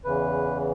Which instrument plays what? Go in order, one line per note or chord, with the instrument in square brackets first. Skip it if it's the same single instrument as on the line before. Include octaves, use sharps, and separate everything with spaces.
[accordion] E2 C#3 E3 B4